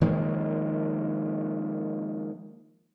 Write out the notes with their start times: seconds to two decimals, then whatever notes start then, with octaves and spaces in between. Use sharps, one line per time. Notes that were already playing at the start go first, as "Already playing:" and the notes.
0.01 D#3 F3 G#3 A#3